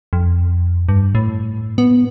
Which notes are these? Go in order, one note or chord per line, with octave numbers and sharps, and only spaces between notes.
F2
G2
A2
B3